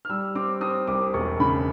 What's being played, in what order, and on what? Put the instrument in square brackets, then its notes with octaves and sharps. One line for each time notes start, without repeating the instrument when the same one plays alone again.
[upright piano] F6
G3 E6
C4 D6
C4 D#6
C2 D6
E1 C#6
C#3 B5